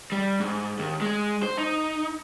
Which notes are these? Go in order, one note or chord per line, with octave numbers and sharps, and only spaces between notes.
G3
G#2
D#2
G#3
C5
D#4